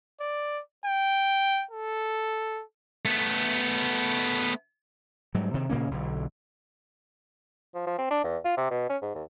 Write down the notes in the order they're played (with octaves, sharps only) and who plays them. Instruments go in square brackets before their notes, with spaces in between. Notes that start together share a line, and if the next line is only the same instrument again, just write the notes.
[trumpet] D5
G5
A4
[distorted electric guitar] A3 B3
[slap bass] G#2 F#3 G3
C3 D#3
A#2 C#3 A#3 C#4
B1 D3
[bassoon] F3
F3
C4
D4
E2
F4
C3
B2
C#4
G#2
D#2